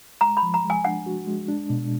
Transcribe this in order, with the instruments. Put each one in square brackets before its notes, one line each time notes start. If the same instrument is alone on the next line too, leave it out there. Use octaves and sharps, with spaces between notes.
[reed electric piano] G#3 [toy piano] A#5
[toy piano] B5
[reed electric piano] F3
[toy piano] A#5
[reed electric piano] G#3
[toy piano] G#5
[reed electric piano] D4 [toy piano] F#5
[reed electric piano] F#4
G#3
D4
B2